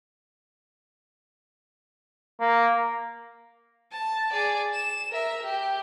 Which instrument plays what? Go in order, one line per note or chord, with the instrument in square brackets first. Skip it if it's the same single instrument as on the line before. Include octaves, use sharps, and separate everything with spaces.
[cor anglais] A#3
[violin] A5
G#4 D5
E7
A#4 E5
G4